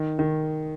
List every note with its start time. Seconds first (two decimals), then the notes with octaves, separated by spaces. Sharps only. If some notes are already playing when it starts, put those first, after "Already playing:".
Already playing: D#3
0.19 D#3